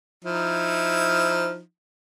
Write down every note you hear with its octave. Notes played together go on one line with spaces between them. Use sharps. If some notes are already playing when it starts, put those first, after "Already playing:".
F3 D#4 E4